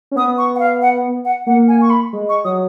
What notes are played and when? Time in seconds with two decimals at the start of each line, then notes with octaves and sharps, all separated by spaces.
0.11 C#4
0.16 B3 D#6
0.38 C#6
0.55 F#5
0.60 F5
0.82 F#5
1.25 F#5
1.47 A#3 F#5
1.68 G#5
1.81 C#6
1.90 B5
2.13 G#3
2.29 C#6
2.44 F#3 D#6